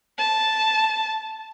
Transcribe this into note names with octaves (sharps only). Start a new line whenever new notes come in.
A5